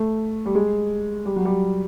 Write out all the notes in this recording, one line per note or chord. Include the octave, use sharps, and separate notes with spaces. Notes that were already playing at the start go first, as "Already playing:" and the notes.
Already playing: A3
G3
G#3
G3
F#3
G3